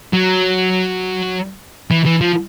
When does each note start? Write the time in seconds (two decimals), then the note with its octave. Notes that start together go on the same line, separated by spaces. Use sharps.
0.13 F#3
1.91 E3
2.05 E3
2.21 F3